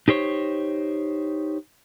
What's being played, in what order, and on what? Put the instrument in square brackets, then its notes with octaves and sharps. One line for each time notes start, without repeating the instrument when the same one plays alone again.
[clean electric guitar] D#4 G4 C5 C#5